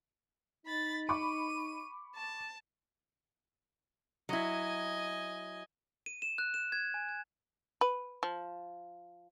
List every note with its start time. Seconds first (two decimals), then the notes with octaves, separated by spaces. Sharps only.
0.66 D#4 B5 A6
1.09 B5 C#6 D6 D#7
2.15 A5
4.29 F#3 E4 D#5 G#5
6.06 D#7
6.22 E7
6.38 F#6
6.54 E7
6.72 G#6
6.94 G#5
7.09 G#6
7.81 B4
8.23 F3